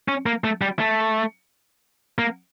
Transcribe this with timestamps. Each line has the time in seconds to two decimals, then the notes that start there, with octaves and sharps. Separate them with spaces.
0.08 C#4
0.26 A#3
0.44 A3
0.62 G3
0.79 A3
2.18 A#3